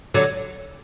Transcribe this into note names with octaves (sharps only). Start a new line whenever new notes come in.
D3 F#3